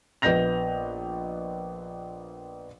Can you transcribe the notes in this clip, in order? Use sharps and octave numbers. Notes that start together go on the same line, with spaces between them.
A#1 B3 D#5 G6 A#6 F7